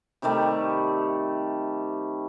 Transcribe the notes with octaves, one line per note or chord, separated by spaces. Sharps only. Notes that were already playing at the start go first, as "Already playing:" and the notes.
C3 D#3 G3 A3